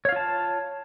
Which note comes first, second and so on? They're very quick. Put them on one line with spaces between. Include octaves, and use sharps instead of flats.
C#5 F5 F4 A5